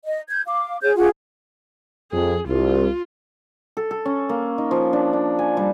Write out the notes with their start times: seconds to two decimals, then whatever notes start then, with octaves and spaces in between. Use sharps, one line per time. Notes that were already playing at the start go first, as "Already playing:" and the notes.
0.05 D#5
0.29 G6 G#6
0.48 F5 D6
0.82 G#4 C#5 G6
0.96 F4 G#4 F#5
2.12 F2 G#4
2.47 C2 F4
3.77 A4
3.91 A4
4.05 C#4
4.29 A#3
4.58 D#4
4.71 F3
4.93 D4
5.13 D4
5.39 G#5
5.57 G3